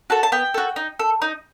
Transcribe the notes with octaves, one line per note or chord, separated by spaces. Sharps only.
F#4 A4 A5
A5
B3 G5
F#4 A4
D#4
A4
D#4